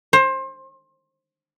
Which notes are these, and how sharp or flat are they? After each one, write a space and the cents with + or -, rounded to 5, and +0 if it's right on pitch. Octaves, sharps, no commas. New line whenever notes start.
C5 +25